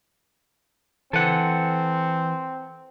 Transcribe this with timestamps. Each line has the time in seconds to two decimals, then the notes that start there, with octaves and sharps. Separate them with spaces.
1.13 E3 C4 A4 F#5